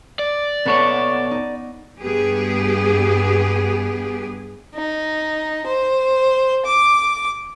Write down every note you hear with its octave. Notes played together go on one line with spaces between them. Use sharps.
D5
B2 B3 A4 C#5 C#6 C#7
D#4
G2 B3 G4 G#4
D#4
C5
D6